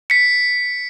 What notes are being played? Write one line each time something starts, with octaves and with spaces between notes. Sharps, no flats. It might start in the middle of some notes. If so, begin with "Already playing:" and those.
B6 C#7